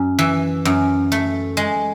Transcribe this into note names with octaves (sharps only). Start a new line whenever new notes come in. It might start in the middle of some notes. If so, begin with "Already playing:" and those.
Already playing: F#2
E3
F#2
A3
G#3